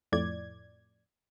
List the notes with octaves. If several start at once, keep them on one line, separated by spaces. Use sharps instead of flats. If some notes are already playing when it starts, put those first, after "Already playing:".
F2 A2 D5 G#6